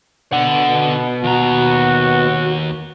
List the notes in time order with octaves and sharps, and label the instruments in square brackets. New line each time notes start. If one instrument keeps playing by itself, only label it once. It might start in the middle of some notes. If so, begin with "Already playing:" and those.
[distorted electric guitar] B2 F#5 [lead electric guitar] D3 D4
[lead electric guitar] D#2 A#5 [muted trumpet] F#4